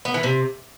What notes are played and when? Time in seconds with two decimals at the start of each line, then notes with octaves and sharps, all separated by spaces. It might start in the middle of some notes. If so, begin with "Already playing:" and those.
0.05 B3
0.14 E3
0.23 C3